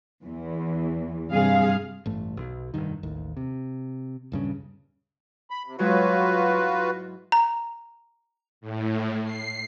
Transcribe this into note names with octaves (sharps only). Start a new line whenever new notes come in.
E2 E3
G2 C3 G3 G#4 F5
A1 G2 A3
B1
F1 A#1 G2 D#3
A1 D#2
C3
D#1 G2 C#3
B5
C3
G#2 F#3 G#3 F4 F#4 B4
E4
A#5
A2
C7